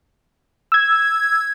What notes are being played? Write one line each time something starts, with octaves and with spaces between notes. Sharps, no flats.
E6 G#6